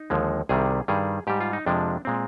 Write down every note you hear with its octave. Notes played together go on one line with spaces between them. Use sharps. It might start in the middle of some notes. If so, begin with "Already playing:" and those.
Already playing: D#4
D#2 D3 F3 G#3
C2 C3 D#3 G3 G#4
G2 D#3 G3 G#4
G#2 G3 G4
F4
D#4
F2 C3 F3 G#3 D4
A#2 G#3 C4